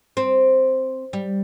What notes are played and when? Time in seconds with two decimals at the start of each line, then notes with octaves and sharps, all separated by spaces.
0.17 C4
1.13 G3